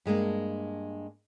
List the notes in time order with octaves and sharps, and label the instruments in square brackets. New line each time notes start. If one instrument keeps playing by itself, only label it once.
[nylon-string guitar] G2 G#3 A#3 D4